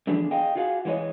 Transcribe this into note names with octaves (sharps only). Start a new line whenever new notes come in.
D3 E3 F3 B3 D4 G#4
G#4 D#5 F5 G5
F4 F#4 G#4 F5 F#5
E3 G#3 F4 C#5 D#5